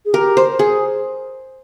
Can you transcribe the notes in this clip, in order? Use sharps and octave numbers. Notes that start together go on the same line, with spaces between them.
G#4
G4 A#4
C5
G#4